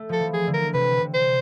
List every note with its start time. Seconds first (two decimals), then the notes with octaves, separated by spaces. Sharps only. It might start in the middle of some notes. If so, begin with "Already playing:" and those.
Already playing: A3
0.09 F3 A4
0.20 E3
0.34 G#4
0.47 D3
0.54 A#4
0.73 C3 B4
1.00 C3
1.14 C5